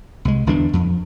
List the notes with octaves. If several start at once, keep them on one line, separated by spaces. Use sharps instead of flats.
C2 G#3
G1 E2 E3 D4
F2